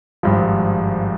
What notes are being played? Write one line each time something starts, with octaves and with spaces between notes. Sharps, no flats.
G#1 G2 F3